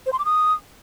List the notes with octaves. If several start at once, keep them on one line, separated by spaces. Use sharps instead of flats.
C5
C6
D6
D#6